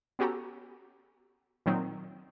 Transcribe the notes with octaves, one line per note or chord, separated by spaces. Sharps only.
B3 C#4 F#4 G4 A4 A#5
A#2 D#3 F#3 C4 D#4